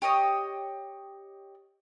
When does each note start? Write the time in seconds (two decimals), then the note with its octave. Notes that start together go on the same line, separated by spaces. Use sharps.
0.02 G4 C#5 D#5 D#6